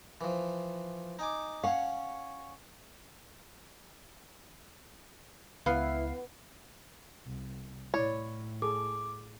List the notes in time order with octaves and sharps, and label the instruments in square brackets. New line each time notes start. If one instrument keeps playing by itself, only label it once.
[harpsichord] E3 F3
D#4 G#5 D6
[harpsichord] C#4 C#5 [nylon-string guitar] F5 F#5
[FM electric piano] C#2 F5 C7 [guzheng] B3 [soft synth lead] E4
[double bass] C2
[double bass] A2 [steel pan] E4 D5 [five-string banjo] C#5
[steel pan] G#4 A4 [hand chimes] D6